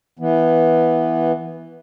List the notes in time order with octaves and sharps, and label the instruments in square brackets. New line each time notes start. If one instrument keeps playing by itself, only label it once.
[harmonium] E3 B3